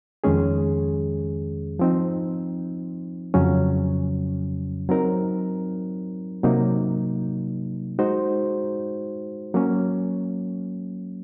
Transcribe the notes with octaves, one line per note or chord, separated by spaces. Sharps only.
F2 D#3 G#3 C#4 G#4
F3 C4 D#4
F2 C#3 F#3 C#4
F#3 C4 D#4 A#4
C3 F#3 A#3 D#4
G#3 D#4 F#4 C5
F#3 A#3 C#4